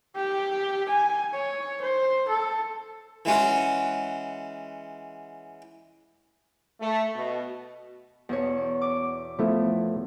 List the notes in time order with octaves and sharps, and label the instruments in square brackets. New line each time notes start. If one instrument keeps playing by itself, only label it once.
[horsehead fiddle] G4
G#5
C#5
C5
A4
[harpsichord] E3 G#3 C#4 F#4
[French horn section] A3
B2
[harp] E2 B2 C#5
D6
[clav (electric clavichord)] F3 A3 E4 [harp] B3